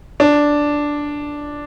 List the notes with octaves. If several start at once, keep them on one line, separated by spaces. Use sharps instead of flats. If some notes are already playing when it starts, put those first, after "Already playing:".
D4